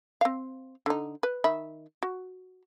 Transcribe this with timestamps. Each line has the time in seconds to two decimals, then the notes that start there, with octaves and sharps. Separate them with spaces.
0.21 C4 F5
0.86 D3 D#4
1.23 B4
1.44 D#3 E5 B5
2.03 F#4